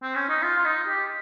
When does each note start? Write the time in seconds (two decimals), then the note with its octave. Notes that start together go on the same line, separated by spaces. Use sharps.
0.03 C4
0.15 C#4
0.29 D#4
0.43 F4
0.58 F4
0.65 D#4
0.88 G4